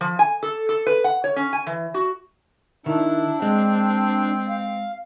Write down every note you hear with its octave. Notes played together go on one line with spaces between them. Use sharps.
F3
G#5
A4
A4
B4
F#5
C#5
C#4
G#5
E3
F#4
D#3 D4 E4
G#3 C4
F5